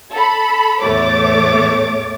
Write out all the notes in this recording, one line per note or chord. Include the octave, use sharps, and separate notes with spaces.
A4 B5
E2 A2 A3 C#5 D6 A6